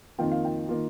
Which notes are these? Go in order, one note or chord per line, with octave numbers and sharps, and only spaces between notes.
F2 D#3 A#3 F4 G5
F5
G5
D#3 A#3 F4